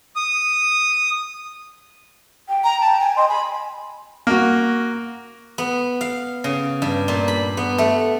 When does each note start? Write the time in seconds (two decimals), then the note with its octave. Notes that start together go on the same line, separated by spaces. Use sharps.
0.16 D#6
2.49 G5
2.64 A#5
2.81 A5
3.00 G#5
3.16 D#5 C6
3.29 G#5 B5
4.27 A#3 F#4
5.58 B3
6.01 F5
6.44 C#3
6.82 G2
7.08 A#2
7.28 B5
7.57 B3
7.78 A3